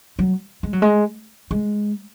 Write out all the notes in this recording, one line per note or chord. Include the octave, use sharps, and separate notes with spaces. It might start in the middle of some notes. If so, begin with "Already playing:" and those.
F#3
G#3
F#3
G#3
G#3